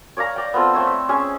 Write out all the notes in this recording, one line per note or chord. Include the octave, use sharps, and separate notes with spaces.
C#5 D5 F5 A#5
D5 G5
B3 C4 F4 A4
A3 C4 C#5 E5
E5
C#4 G#4 E5